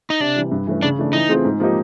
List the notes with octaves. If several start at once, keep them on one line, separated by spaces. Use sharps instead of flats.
D#4
C3 D4
E3 G3
G2
E3 A3 C#4
C#3 D4
E3 A3 D4
E3 D#4
A3 C4 F4 G#4
G#2
F3 A#3 D#4 G4